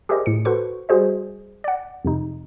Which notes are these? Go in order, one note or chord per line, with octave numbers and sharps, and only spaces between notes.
G4 G#4 A#4 C5 D5 D#5
A2 C#7
F#4 A4 B4 C5 C#6
G3 F#4 G#4 C5 D#5
D5 F#5
F2 C3 D#4